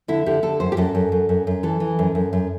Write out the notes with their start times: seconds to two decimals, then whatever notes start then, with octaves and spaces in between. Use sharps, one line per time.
0.08 D3 E4
0.26 D3 G4
0.43 D3 A4
0.60 F#2 C5
0.72 G4
0.77 F#2 A4
0.95 F#2
1.12 F#2
1.29 F#2
1.47 F#2
1.63 E3 A4
1.80 E3
1.99 F#2
2.15 F#2
2.33 F#2